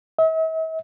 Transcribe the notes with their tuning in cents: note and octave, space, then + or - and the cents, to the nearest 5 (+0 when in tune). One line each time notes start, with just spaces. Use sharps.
E5 -45